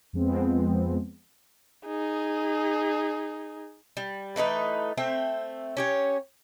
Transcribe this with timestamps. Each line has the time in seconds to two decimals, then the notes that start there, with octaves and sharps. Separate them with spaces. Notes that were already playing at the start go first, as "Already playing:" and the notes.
0.13 F2 F3 G#3 B3 C4
1.87 D#4 G#4
3.97 G3
4.36 E3 A3 D#4 B4
4.98 A3 C4 E5 G5
5.77 C#4 G4 C#5